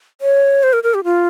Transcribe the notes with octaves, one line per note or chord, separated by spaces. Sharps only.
C#5
C5
A#4
A#4
G4
F4